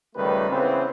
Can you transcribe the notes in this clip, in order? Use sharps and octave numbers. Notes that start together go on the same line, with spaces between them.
C#2 D#3 G3 A3 B4
C#3 E3 B3 C4